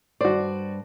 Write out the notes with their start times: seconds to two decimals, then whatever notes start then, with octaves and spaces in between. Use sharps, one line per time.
0.21 G2 F#4 C5 D5